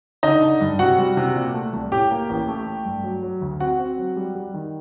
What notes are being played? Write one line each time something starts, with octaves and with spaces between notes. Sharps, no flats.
D3 D#4 D#5
D3
G2
C3 F#4 F#5
G3
C3
A#2
A3
C2
A2 G4 G5
A#3
A1
A3
A3
G2
F#3
F#3
D2
C4 F#4 F#5
C4
F#3
G3
G3
D#3